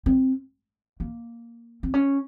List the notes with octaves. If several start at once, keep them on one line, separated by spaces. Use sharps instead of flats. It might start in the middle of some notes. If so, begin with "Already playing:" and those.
C4
A#3
C4
C#4